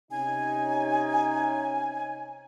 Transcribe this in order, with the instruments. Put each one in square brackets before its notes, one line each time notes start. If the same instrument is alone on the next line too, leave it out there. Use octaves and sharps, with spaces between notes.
[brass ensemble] C3 C#4 D#4 [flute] G#5